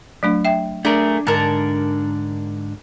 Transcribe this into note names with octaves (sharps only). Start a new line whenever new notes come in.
F#3 A3 D4
E5 G5
A3 D4 G#4 A#4
G#2 D3 A#4 A5